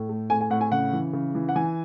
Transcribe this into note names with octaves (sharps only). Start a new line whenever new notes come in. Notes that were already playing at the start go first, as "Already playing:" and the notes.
Already playing: A2
A3
A2 G#5
G#5
A2 F#5
G#5
C#3 F#5
E3
C#3
E3
F#5
E3 G#5